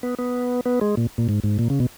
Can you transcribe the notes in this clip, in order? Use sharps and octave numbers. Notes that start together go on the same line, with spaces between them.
B3
B3
B3
G#3
A#2
A#2
G#2
G#2
A#2
C#3
B2